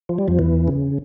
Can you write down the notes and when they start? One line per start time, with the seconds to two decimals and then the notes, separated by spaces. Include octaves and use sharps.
0.09 F3
0.18 G3
0.28 F2 F3
0.39 E2 E3
0.68 C#3